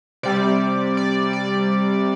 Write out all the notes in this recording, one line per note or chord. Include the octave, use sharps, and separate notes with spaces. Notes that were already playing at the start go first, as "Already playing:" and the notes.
C3 G3 D5
D5
D5